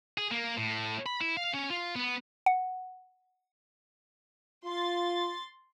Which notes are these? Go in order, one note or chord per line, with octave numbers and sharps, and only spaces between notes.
G#4
A#3
A2
B5
E4
F5
C#4
F4
B3
F#5
F4 C6 A6